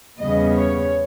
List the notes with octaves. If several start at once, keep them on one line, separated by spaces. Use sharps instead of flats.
E2 C#3 G3 B3 D#5
C#5